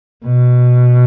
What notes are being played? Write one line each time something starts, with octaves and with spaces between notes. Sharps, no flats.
B2